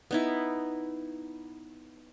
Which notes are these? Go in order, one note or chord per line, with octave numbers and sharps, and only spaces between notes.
B3 D#4 E4